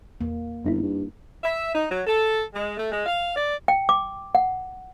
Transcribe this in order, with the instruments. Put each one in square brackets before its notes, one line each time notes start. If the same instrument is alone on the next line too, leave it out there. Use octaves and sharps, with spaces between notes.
[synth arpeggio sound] E2 [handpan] A#3
[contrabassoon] G1 [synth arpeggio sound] F#2 D#4 E4
[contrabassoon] G2
[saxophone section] E5
D#4
F#3
A4
G#3
A3
G#3
F5
D5
[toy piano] G5
D6
F#5